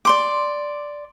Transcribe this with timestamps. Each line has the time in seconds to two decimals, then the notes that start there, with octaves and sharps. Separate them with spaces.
0.05 D5 C6 D6